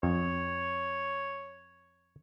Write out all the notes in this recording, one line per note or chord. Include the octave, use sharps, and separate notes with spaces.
F2 C#5